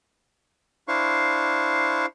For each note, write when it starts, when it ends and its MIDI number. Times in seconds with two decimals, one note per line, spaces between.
0.88 2.06 62
0.88 2.06 64
0.88 2.06 72
0.88 2.06 77
0.88 2.06 85